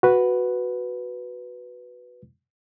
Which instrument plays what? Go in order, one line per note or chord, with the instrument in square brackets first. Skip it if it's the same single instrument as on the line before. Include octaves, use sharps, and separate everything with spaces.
[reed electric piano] F#4 B4